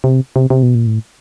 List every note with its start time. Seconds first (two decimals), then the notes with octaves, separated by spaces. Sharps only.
0.04 C3
0.36 C3
0.50 C3
0.63 B2
0.75 A#2
0.87 A2